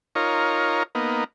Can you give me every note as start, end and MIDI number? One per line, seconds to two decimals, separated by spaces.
0.15 0.83 63
0.15 0.83 65
0.15 0.83 70
0.15 0.83 73
0.95 1.24 58
0.95 1.24 59
0.95 1.24 63